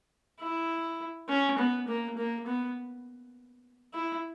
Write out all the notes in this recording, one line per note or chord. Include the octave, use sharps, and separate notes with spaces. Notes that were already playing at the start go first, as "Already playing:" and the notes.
E4
C#4
B3
A#3
A#3
B3
E4